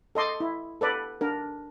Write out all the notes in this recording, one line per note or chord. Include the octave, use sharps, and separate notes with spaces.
A4 D#5 C6 D6
E4
A4 B4 D5
D4 A#4